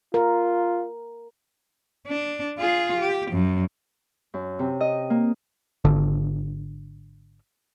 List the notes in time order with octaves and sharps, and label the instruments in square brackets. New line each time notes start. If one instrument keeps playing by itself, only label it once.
[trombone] F4 [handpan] A#4
[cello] D4
F4 G#4
G4
F#2
[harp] F#2
C3
D#5
A#3
[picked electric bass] G#1 D3